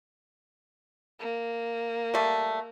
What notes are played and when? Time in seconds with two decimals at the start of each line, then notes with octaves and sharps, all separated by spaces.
1.20 A#3
2.14 G3 A3